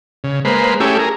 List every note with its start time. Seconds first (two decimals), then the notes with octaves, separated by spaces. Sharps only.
0.24 C#3
0.45 G#3 A#3 B4 C5
0.80 A3 C#4 E4 G4 G#4
0.99 G#4 A#4